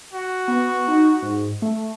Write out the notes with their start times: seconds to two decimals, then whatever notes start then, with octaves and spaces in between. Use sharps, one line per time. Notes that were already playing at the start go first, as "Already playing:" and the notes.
0.14 F#4
0.48 B3
0.88 D#4
1.22 G#2
1.62 A3